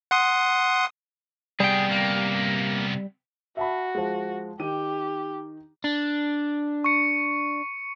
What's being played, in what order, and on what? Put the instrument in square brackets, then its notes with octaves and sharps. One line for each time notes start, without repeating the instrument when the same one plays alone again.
[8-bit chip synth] F#5 C6 D#6
[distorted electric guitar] C3 B3 [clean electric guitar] G3 G5 [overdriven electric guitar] G#4
[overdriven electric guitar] A#3
[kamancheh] F#4 [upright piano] E5 A5 B5
[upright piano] F3 G#3
[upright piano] D#3 D#4 D#7 [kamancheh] G4
[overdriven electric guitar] D4
[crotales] C#6 C#7